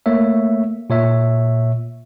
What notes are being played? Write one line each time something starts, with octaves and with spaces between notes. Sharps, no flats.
A3 A#3 C#5 E5
A#2 C#5 E5